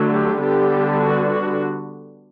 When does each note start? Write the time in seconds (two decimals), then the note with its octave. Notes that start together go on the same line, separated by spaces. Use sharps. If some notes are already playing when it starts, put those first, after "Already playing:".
Already playing: D3 F#3 A3
0.11 G4
0.40 D3 G3 B3 D4 G4
1.00 F#4
1.30 F#4